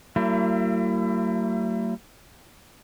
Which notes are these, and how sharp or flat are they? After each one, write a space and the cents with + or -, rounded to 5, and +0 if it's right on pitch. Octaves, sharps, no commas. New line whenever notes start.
F#3 +45 A#3 -45 E4 +30